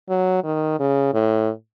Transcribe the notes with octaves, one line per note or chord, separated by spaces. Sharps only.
F#3
D#3
C#3
A2